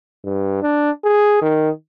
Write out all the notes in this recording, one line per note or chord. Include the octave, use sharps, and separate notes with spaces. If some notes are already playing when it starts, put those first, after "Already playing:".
G2
D4
G#4
D#3